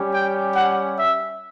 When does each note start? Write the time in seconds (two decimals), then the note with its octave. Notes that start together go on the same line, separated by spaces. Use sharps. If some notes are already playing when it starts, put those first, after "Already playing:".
Already playing: G3 C#4 G4
0.11 G5
0.53 F#5
0.97 E5